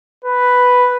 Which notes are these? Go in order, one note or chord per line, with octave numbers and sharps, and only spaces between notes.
B4